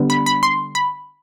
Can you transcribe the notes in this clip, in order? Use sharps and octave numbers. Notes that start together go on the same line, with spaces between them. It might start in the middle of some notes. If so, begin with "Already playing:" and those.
Already playing: D3 G3 B3
B5
B5
C6
B5